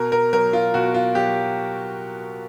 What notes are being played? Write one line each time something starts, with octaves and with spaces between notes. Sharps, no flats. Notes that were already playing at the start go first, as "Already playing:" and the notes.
Already playing: B2 A#4
A#4
F#3 A#4
F4
B2 F#4
F4
F#3 G4